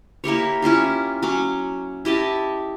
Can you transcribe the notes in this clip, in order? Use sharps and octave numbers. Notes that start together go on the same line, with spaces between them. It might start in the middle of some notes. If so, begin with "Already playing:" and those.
A#3 E4 G4 C#5
C#4 E4 F4 G4
F#3 C#4 D6
E4 G4 D#5 A5